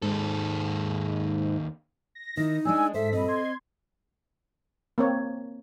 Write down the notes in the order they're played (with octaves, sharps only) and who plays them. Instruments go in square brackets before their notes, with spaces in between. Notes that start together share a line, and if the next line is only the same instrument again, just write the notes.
[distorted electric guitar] D#2 A4 [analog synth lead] G#2
[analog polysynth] A#6
[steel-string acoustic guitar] D#3 E4 [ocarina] D#4
[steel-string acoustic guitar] G#3 D4 G#4 [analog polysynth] G#5 [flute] E6
[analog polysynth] G#2 B6 [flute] A4 [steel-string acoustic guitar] C5 [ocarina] E5
[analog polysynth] G2 A#2 B5 [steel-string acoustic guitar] C4 [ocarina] D#5
[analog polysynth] C6 G#6
[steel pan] A#3 C4 C#5